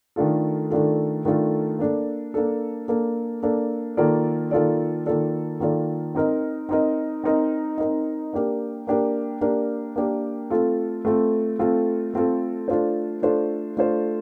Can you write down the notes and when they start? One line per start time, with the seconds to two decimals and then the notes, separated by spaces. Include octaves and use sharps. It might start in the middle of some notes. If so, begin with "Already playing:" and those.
0.16 D#3 A3 D4 F4 A4
0.70 D#3 A3 D4 F4 A4
1.25 D#3 A3 D4 F4 A4
1.79 A#3 D4 A4
2.34 A#3 D4 A4
2.88 A#3 D4 A4
3.43 A#3 D4 A4
3.97 D#3 A#3 F4 A4 D5
4.51 D#3 A#3 F4 A4 D5
5.06 D#3 A#3 F4 A4 D5
5.60 D#3 A#3 F4 A4 D5
6.15 C4 D#4 A#4 D#5
6.69 C4 D#4 A#4 D#5
7.24 C4 D#4 A#4 D#5
7.78 C4 D#4 A#4 D#5
8.33 A#3 D4 G4 A#4
8.87 A#3 D4 G4 A#4
9.41 A#3 D4 G4 A#4
9.96 A#3 D4 G4 A#4
10.50 A3 C4 F4 A4
11.05 A3 C4 F4 A4
11.59 A3 C4 F4 A4
12.14 A3 C4 F4 A4
12.68 A3 D4 F4 A4 C5
13.22 A3 D4 F4 A4 C5
13.77 A3 D4 F4 A4 C5